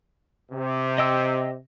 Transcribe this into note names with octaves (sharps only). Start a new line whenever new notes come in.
C3
D#5 G5 E6